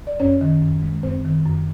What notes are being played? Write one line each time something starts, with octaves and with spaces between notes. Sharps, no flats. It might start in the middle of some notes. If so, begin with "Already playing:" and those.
D5
F#2 C#4 C#5
D#3
F#2
G#3
F#2 C4 C5
D#3
F#2